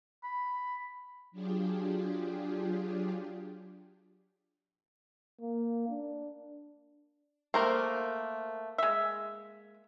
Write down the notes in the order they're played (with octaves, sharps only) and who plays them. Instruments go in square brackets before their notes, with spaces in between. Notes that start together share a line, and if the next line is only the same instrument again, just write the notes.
[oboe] B5
[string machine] F#3 D4 F4 G4 G#4
[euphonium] A#3
D4
[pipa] A3 [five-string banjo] A#3 A#4 C5
[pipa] G#3 E5